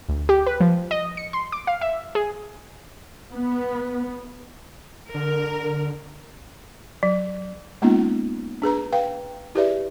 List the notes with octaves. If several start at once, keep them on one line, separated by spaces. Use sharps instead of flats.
D2
G4
B4
F3
D#5
C#7
C6
D6
F5
E5
G#4
B3
D3 A#4
F#3
G#3 A#3 B3 C#4 D#4 F4
D4 G#4 B4 A#5
B4 F5 G5
E4 G4 G#4 B4 D5 E5